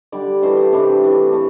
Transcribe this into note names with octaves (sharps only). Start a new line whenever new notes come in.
D3 G3 D4 D5
E3 A3 D4 C5
G4
C3 E3 A3 C4 D4
E3 A3 D4
E3 A3